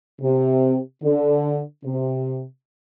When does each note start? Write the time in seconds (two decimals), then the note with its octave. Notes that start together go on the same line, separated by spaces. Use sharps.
0.21 C3
1.03 D3
1.85 C3